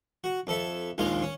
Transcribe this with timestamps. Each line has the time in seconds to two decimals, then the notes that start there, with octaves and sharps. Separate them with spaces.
0.24 F#4
0.47 F2 A4 E5
0.98 A#1 D#2 G#3 F4 F5
1.22 C#4